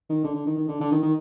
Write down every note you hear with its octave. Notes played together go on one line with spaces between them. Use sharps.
D#3
D3
D3
D#3
D#3
D3
D3
D#3
D#3